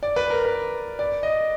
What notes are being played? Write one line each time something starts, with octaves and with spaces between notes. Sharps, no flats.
D5
B4
A#4
B4
D5
D#5